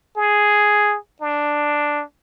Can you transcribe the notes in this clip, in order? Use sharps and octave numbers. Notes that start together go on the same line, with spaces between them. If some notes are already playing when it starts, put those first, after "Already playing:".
G#4
D4